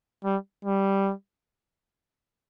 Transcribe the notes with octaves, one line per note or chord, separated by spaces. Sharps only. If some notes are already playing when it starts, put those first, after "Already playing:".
G3
G3